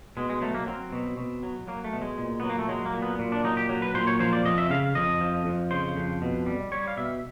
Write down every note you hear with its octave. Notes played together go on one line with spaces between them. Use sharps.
B2 G#3
G#3
F#3 A3
A#3
F#3 C4
B2
B2
F#3
F#3 A#3
A3
B2
G#3
A#2
F#3 B3
A#3
A3
F#3 G#3
A#3
A#2
B3
A#2
D4
F#3 D#4
G4
F#3
B4
A#2 C5
C#5
F3 C5
D5
F2 D#5
E5
C#3 F5
F2 D#5
F3
F2
C#3 C5
F2
B2
G3
G3 C#5
F5
B2 E5